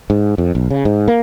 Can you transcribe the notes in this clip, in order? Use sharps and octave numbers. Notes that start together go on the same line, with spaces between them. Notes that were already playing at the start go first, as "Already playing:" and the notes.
G#2
F2
B1
C#3
G#2
A#3